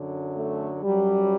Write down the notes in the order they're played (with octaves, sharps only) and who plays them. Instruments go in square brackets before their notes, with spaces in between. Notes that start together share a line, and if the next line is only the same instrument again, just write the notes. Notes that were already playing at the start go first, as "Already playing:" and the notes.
Already playing: [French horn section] F#2 D3 F#3
A3
F#2 F#3 G3